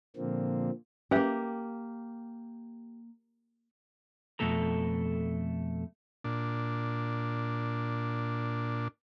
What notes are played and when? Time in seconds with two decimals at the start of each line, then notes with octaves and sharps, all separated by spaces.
0.16 A#2 D3 F3 A#3 C4
1.11 A#3 C#4 G4 B4 E5
4.39 F2 B2 A3 A4 A#5
6.24 A#2 D4